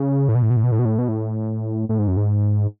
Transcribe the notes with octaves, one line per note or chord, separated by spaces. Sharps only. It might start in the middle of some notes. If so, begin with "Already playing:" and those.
Already playing: C#3
A2
B2
A2
B2
A2
B2
A2
B2
A2
B2
A2
A2
G#2
F#2
G#2